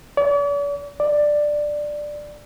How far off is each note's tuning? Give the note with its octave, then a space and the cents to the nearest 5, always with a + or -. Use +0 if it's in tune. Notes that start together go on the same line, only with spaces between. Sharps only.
D5 -45
D5 +10